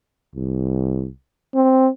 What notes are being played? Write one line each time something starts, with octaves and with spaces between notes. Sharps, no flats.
C2
C4